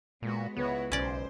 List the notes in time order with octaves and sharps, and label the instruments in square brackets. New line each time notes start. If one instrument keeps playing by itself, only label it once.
[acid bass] A#2 [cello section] G#3 B3 F#4
[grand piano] C#2 B4 [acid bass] B3 [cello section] E4 F#4 C#5
[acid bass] B1 [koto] C#4 D5 [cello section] C5